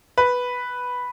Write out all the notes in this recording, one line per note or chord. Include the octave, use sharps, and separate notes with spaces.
B4